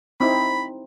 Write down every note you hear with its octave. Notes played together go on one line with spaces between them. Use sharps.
C4 D#4 E4 B5